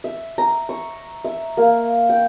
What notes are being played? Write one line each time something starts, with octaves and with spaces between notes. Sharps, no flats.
E5
A#5
C#6
E5
A#3
G5